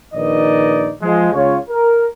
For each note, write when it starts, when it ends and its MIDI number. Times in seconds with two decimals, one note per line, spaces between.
0.14 0.91 34
0.14 0.91 51
0.14 0.91 63
0.14 0.91 71
0.14 0.91 74
0.14 0.91 75
1.02 1.29 53
1.02 1.29 56
1.33 1.57 37
1.33 1.57 49
1.33 1.57 65
1.33 1.57 73
1.70 2.06 70